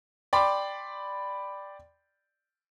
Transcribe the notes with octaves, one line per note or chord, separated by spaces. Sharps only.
D5 G5 B5 C6 D6